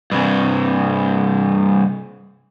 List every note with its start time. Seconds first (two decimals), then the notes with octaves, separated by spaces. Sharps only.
0.12 C2 G2